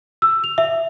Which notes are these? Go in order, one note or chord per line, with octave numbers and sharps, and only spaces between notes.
E6
F7
E5